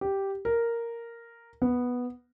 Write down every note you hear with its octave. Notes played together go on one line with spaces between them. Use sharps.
G4
A#4
B3